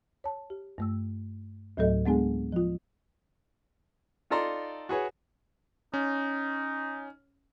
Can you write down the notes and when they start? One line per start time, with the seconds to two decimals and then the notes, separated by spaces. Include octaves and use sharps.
0.24 C#5 A5
0.50 G4
0.78 G2 A3 E6
1.77 D2 A2 F#3 A3 A4 D#5
2.06 G#3 B3 D4 G#4 G#5
2.52 F3 F4
4.30 D#4 F4 A4 D5 A#5 C6
4.89 F#4 G#4 B4 C#5
5.94 C#4 D#4